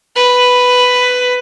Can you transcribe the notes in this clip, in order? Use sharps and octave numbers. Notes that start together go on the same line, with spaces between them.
B4